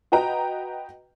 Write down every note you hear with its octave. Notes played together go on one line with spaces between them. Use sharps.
F#4 B4 D#5 G5 A#5